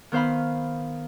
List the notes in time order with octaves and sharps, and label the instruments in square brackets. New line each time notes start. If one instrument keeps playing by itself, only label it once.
[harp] D#3 B3 C5 F5 B5